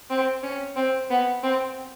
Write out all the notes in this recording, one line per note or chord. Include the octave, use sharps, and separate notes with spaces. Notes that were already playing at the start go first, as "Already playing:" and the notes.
C4
C#4
C4
B3
C4